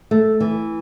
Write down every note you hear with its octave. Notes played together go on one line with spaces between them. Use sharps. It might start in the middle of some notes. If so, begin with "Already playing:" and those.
A3
E3